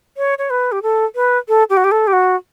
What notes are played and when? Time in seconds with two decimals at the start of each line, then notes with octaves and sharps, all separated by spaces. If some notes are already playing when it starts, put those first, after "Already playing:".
0.17 C#5
0.38 C#5
0.50 B4
0.72 G4
0.83 A4
1.15 B4
1.48 A4
1.70 G4
1.77 F#4
1.84 G4
1.92 A4
2.07 G4
2.13 F#4